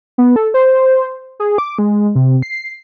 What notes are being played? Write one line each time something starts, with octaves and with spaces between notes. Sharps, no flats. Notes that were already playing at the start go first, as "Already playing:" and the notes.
B3
A4
C5
G#4
D6
G#3
C3
C7